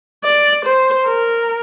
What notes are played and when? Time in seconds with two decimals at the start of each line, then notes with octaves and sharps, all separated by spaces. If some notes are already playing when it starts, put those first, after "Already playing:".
0.24 D5
0.65 C5
1.07 A#4